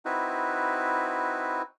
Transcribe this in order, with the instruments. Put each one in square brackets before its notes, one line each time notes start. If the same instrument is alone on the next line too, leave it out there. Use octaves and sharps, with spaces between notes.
[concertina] C4 D#4 E4 F#4 B4